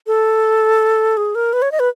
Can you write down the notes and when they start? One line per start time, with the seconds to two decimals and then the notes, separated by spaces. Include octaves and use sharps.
0.07 A4
1.17 G#4
1.35 A#4
1.53 B4
1.62 C#5
1.72 D#5
1.80 B4